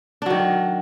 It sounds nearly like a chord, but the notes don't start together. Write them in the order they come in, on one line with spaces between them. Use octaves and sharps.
D4 F#3 D#3